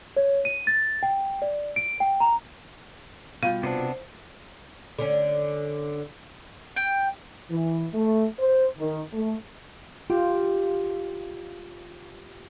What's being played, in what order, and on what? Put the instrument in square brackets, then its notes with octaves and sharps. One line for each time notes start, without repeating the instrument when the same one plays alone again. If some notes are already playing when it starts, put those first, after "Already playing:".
[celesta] C#5
D#7
A6
G5
D5
D7
G5
A#5
[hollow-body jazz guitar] B2 F4 G5 [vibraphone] G3 [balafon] F5
[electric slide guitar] C3 B3 D4 [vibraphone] C5
[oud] D3 C#4
[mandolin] G5
[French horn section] E3
A3
C5
D#3
A3
[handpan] F4 [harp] G4